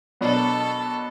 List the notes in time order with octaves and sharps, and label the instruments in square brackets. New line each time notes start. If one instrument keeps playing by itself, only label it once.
[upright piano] B2 F#3 B3 D4 [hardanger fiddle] A4